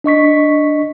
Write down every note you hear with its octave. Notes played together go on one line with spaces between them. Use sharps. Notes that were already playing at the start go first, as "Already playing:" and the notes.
D4 D#5 C#6 B6